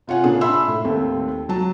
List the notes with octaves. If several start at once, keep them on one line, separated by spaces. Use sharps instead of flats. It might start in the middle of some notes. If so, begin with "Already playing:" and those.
C3 F4 C#5 F#5 G#5
A#2 C#3 D4 G#4
E5 B5 C6 E6
A2
D#2 A3 C4
F#3 A5